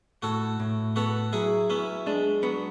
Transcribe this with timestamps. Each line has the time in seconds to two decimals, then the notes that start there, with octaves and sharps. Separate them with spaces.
0.22 A2 F#4 A4
0.60 A2
0.96 B3 F#4 A4
1.33 F#3 E4 G#4
1.70 B3 C#4 E4
2.06 G#3 D4
2.43 F#3 B3